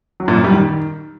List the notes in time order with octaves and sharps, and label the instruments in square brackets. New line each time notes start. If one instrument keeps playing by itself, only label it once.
[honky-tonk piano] F#3
A#2
F#2
G3
D#3